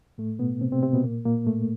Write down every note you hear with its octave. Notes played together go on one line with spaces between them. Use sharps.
A2 A3
B2 B3
C3 C4
C3 C4
C3 C4
B2 B3
A#2 A#3
A#2 A#3
A2 A3